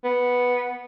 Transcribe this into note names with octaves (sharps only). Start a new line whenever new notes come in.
B3